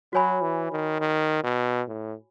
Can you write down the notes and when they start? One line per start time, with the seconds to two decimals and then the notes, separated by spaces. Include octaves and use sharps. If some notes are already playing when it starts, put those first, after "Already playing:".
0.13 F#3 F#4 C#5 G#5 B5
0.42 E3
0.72 D#3
1.00 D#3
1.44 B2
1.88 A2